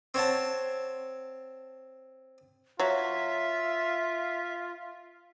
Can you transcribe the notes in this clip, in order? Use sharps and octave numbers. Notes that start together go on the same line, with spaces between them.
C4 C#5 F#5 A5
F#3 F4 E5